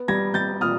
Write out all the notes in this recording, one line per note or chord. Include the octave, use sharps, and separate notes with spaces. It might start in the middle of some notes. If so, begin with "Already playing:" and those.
Already playing: B3
G3 G#6 A#6
G3 G6 A6
A#2 D#6 F6